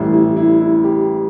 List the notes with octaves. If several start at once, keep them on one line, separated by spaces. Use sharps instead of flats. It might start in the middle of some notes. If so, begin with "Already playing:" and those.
Already playing: A1 A2 E3 G3 E4
E4
E4
E4
G4